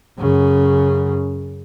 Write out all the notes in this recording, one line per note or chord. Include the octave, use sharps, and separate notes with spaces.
F#2 C#3